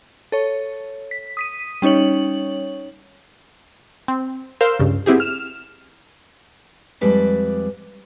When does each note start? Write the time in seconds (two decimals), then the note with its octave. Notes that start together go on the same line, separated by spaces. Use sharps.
0.32 A4 C#5
1.11 B6
1.37 D#6 B6 D#7
1.82 G3 C#4 D#4 C#5 F#7
4.08 C4
4.61 A#4 C5 F5 C6 E6
4.79 C#2 G2 C#3
5.06 B3 C4 E4 G4 G#4
5.20 F6 E7
7.01 F2 G3 G#3 B4 D5 A5